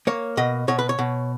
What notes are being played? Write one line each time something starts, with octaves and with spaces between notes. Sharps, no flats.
A#3 C#5
B2 D#5
B2 C#5
B4
C#5
B2